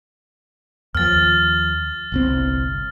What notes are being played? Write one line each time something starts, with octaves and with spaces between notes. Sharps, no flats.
D#2 F3 F6 A6
G1 C2 C4